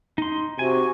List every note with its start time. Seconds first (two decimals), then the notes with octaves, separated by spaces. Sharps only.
0.18 D#4 C6
0.59 C3 F#4 G#5